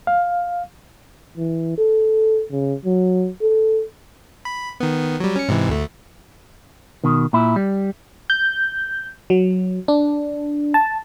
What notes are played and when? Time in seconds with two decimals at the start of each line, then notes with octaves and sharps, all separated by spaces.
0.07 F5
1.37 E3
1.77 A4
2.51 C#3
2.85 F#3
3.42 A4
4.45 B5
4.80 D#3 B3
5.20 F#3 G3
5.36 C#4 C#7
5.48 G#2 C3 E3
5.69 D2 A3
7.04 B2 D#3
7.33 A#2 E4
7.56 G3
8.30 G6
9.30 F#3
9.88 D4
10.74 A5